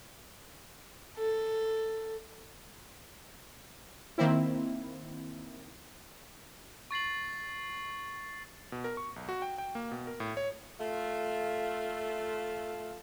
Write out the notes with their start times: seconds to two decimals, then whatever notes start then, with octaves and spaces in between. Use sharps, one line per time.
1.18 A4
4.18 D#3 A#3 C4 E4
6.91 C#6 A6 C7 F#7
8.72 B2
8.84 A#4
8.97 C#6
9.16 B1
9.29 F#4
9.42 G5
9.58 G5
9.75 A#3
9.91 B2
10.07 A#4
10.20 A2
10.37 C#5
10.80 A3 F4